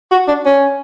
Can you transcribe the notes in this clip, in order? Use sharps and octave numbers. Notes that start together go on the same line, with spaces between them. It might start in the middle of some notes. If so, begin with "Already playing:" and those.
F#4
D4
C#4